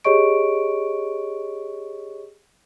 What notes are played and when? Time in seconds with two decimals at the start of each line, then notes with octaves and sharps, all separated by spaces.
0.04 G4 G#4 C#5 D#5 C#6 D7